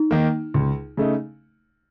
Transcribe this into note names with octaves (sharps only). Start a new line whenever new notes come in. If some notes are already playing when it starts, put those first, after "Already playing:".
Already playing: D#4
D#3 A#3
C#2
C#3 A3 D#4